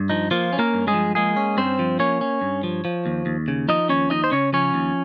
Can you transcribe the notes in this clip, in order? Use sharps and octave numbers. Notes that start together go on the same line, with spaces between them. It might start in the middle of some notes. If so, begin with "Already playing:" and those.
Already playing: G2
F3 D#4
F3 A#3 F4
C#4
A#3 A#4
G2
G#3 G#4
F3
G#3 A#3 G#4
C#4
G2 C4 C5
F3
A#3 C#4 C#5
C#4
G2
F3
F3
D#2
D#2
C#3
F3 D#4 D#5
D#2 C#4 C#5
D#2 D#4 D#5
C5
C#3 C#4 C#5
F3 C#4 C#5
D#2